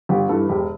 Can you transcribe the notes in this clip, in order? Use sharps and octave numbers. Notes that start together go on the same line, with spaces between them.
G1 G4
G2 E3 A4
E1 G4